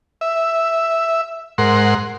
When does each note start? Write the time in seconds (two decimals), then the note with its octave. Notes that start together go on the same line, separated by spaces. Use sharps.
0.21 E5
1.58 G#2 A#4 F#5 C6